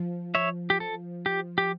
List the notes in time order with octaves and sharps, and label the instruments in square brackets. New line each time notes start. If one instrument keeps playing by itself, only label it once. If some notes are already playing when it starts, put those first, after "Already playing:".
Already playing: [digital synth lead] F3
[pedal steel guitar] C#5 E5
G4
A4
G4
G4